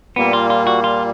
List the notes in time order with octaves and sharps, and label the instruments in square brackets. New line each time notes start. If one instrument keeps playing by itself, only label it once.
[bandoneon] A#2 G3 A#3 [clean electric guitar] B3
[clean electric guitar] F4
F4
F#4
F4